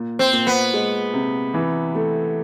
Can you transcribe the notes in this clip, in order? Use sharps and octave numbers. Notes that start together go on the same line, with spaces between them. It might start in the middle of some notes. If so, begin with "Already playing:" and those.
Already playing: A#2
C4
A#2
B3
G#3
C3
E3
A3